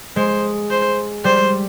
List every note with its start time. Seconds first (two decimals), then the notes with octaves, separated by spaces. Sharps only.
0.16 G#3 C5
0.70 C5
1.24 G3 C5